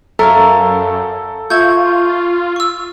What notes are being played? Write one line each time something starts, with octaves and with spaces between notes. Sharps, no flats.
F#2 A4 A#4 C#5 E5 F5
F4 E5 C#6 G6 G#6
C#6 E6